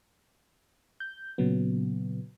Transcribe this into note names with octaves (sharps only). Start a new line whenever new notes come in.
G6
A#2 C#3 F#3 B3